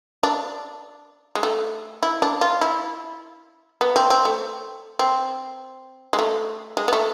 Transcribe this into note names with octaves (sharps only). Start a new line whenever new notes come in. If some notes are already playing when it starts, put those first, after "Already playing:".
D4
G#3
A3
E4
D4
F4
E4
B3
C4
C4
A3
C4
G#3
A3
G#3
B3
A3